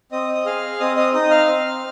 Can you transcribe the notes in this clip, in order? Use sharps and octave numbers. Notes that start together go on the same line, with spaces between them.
C4 D#5 D#6
D#6
G#4 F5 F6
C4 D#5 D#6
D#5 D#6
D#4 D#5 D#6
F5 F6
C4